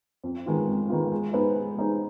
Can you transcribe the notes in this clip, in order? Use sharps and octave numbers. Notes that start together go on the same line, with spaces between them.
F2
D#3 G#3 B3 F4
F2
D#3 G#3 B3 F4
G#3
B3 D#4 G#4 C5
G#3
B3 D#4 G#4 C5